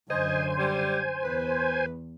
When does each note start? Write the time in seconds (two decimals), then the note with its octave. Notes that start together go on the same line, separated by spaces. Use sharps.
0.10 F#2 D3 C5 D#5 G#5
0.59 G3
1.23 E2 B4